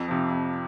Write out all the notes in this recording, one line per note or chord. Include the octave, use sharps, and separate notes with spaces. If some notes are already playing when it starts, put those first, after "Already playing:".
Already playing: F2
C3 F3
F2